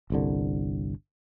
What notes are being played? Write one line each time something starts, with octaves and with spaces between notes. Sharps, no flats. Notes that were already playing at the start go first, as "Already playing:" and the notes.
G1 C2 D3